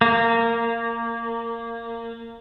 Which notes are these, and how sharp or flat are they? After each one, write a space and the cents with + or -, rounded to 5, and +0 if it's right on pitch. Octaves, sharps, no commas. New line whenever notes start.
A#3 -15